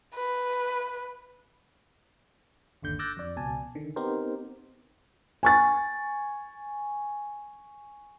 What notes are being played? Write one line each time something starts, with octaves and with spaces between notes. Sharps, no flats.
B4
G1 D#2 D3 G6
D6 E6 F#6 G6 A6 A#6
F2 D5
C#2 B2 G#5 A5
D3 D#3
B3 C4 D#4 G4 A#4 C5
G#5 C#6 A6